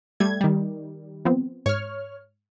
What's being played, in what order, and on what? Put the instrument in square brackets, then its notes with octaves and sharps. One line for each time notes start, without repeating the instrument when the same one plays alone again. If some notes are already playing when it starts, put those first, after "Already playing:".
[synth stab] G3 A3 G#6
D#3 G3
[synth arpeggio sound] F3 B3 C4
[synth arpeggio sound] G#2 [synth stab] C#5 F6